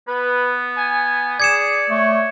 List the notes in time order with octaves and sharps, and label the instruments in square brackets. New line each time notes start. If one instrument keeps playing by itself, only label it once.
[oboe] B3 [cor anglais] B4
[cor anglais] G#5
[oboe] G#4 [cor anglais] D5 [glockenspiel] G#6 C#7 E7
[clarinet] A3 [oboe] C#5